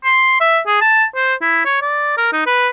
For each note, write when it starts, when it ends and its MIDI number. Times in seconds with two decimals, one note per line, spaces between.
0.04 0.39 84
0.41 0.59 76
0.67 0.79 68
0.81 1.04 81
1.15 1.35 72
1.41 1.64 64
1.65 1.81 73
1.82 2.17 74
2.17 2.27 70
2.33 2.43 63
2.46 2.69 71